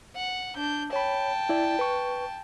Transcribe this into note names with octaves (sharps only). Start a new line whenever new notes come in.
F#5
D4 G6
C#5 G5 A5 B5
E4 D5
B4 C#6